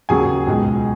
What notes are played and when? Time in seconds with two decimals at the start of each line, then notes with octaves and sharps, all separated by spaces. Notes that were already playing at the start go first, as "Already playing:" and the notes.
0.09 D#2 C#3 F#3 G#4 G#5
0.47 C#2 B2 G#3